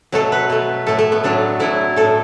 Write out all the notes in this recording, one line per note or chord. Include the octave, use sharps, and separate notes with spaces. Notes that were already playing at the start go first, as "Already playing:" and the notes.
B2 F#3 A3 A4
B4
B2 A3
A2 A3 A4
A3
B3
A2 F#3 A3 D4
A2 F#3 A3 E4
A2 A3 A4